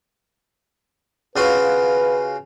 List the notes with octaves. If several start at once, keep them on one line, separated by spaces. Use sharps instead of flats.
C#3 F4 F#4 B4